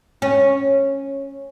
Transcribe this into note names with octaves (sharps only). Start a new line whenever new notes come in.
C#4